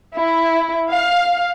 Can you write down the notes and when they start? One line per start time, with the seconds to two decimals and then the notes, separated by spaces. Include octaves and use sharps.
0.14 E4
0.91 F5